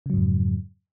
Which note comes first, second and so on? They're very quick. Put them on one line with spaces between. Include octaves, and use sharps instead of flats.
C#3 F#3 G#2 F2